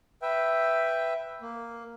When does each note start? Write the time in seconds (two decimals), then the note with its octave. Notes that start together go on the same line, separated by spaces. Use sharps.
0.22 B4 E5 G5
1.42 A#3